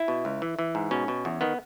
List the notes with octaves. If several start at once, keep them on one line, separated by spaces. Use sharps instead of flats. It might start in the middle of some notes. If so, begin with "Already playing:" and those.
Already playing: E4
B2
C#2
E3
E3
G#2
B2 C#4
B2
E2
D#3 B3